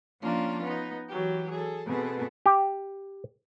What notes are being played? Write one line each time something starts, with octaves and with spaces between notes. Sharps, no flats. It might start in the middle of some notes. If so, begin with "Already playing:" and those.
F3 A#3 C#4 D4 F4
B3 D#4
E3 F#3 G4
G#4 A4
B2 B3 C4 G#4 A4
G4